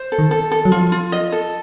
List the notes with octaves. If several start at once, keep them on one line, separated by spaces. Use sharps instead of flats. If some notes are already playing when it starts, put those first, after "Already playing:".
Already playing: C5
A4
D#3
A4
A4
F#3
F3 F4
F4
D#5
A4